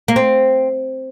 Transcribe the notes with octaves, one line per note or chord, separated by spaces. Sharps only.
A#3
C4